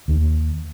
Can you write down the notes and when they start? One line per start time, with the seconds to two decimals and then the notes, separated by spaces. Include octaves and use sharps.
0.08 D#2